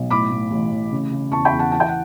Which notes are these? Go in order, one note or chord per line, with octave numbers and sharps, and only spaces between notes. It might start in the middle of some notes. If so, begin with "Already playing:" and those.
Already playing: B1
A2 B5 D6
A2
A1
A1
C#3
C#3
E2 A5 C#6
G5 B5
E2
F#5 A5
E3 A5
G5
F#5